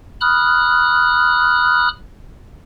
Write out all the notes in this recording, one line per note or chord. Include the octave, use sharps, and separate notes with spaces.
B5 D#6 F6 F#6